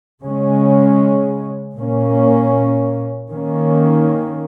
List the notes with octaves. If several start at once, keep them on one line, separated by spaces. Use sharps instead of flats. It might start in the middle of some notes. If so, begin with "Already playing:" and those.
C#3 G#3 C#4
A#2 A#3 C#4
D#3 A#3 C#4